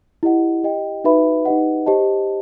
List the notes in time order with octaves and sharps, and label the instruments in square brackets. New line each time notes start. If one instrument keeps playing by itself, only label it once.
[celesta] E4 G4 D#5 F#5
G4 D#5 G5
D#4 F#4 B4 E5 B5
D#4 G4 B4 D#5 F#5
G4 C5 D#5 A5